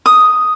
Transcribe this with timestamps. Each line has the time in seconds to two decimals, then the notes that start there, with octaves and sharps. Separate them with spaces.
0.06 D#6